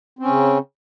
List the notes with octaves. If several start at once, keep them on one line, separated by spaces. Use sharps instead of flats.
C#3 C4 C#4